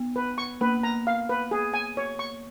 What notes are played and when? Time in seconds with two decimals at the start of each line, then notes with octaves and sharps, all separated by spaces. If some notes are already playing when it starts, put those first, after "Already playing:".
Already playing: B3
0.16 B4
0.38 C#6
0.61 A#3 B4
0.83 A#5
1.07 F5
1.29 B4
1.51 G#4
1.74 G#5
1.97 C#5
2.19 C#6